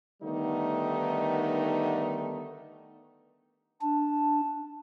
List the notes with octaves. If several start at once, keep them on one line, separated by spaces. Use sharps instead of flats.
D3 D#3 G3 A3 B3 D#4
D4 A5